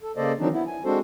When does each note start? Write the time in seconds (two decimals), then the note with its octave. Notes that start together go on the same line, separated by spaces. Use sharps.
0.02 A4
0.17 C#3 A#3 A4 C5 D5 D#5
0.39 D#3 E3 F#3 C4 D4 D#4
0.53 B3 E4
0.67 G#5
0.85 G#3 C4 D4 F#4 A4 C5